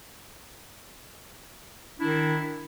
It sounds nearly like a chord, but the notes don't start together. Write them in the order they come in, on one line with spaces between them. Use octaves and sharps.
E4 D4 D#3